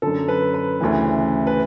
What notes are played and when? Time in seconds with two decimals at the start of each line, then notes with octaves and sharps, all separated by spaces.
0.02 F#2 D3 A4
0.28 B4
0.54 B4
0.81 D2 C#3 E3
1.47 B4